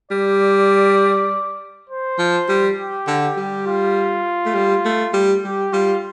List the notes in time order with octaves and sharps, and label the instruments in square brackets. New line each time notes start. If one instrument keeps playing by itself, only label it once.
[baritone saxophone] G3 [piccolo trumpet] D5
[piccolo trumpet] C5
[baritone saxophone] F3
G3
[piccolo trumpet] G4
[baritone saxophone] D3
[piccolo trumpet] G4
[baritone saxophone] G3
[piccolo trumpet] F4
[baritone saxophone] A3
G3
A3
G3
[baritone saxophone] G3 [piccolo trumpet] G4
[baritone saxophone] G3 [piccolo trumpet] F4